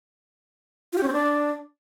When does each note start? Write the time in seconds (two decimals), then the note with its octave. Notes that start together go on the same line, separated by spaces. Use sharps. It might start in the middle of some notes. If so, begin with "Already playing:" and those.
0.93 F4
0.98 G4
1.03 C#4
1.08 C4
1.13 D4